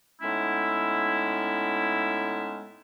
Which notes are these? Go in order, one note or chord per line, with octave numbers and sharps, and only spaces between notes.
A2 G#3 B3 C#4 D#4 E4